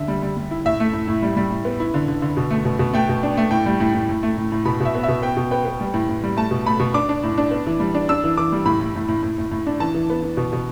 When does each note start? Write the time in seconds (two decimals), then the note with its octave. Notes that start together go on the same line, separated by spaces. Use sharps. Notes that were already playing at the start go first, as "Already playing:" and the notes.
Already playing: D3 E5
0.08 G3
0.22 G3
0.37 G3
0.51 E4
0.65 A2 E5
0.80 A3
0.93 A2
1.08 A2
1.22 G3
1.37 G3
1.50 A2
1.65 B3
1.80 E4
1.94 D3
2.08 D3
2.22 D3
2.37 B2
2.50 A3
2.65 B2
2.79 B2
2.93 A3 G5
3.09 B2
3.23 D4
3.37 A3
3.51 A2 G5
3.66 G3
3.80 A2
3.94 A2
4.09 A2
4.23 A3
4.37 A2
4.52 A2
4.65 B2 B5
4.80 B2 E5
4.95 B3
5.03 B2 E5
5.22 B3 G5
5.37 B2
5.51 B3 G5
5.65 B3
5.81 G3
5.94 A2
6.09 A2
6.24 G3
6.37 A3 A5
6.51 B2
6.65 A3 B5
6.80 B2
6.94 D4 D6
7.09 D4
7.23 A2
7.38 D4
7.51 B3
7.67 E3
7.80 G3
7.95 D4
8.09 D4 E6
8.24 E3
8.37 E3 D6
8.52 G3
8.65 A2 B5
8.80 A2
8.95 A2
9.08 A2
9.23 A2
9.38 A2
9.51 A2
9.67 D4
9.80 E3 A5
9.94 E3
10.10 B3
10.23 E3
10.37 B2
10.53 B2